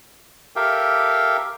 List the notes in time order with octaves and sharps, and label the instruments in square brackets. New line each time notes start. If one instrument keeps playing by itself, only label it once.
[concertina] G4 A4 A#4 E5 F5 G5